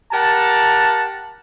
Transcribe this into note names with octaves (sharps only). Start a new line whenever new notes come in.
G4 A#4 F#5 A5